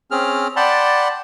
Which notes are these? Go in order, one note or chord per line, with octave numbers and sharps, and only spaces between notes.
C4 C#4 G#4 F6
D5 F#5 G5 A5 B5 C6